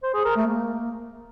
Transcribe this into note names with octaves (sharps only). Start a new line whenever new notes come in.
C5
G#4
A#4
A3
A#3